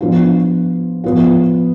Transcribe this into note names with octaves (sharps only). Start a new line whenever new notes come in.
F3 B3 D4 F4
F3 B3 F4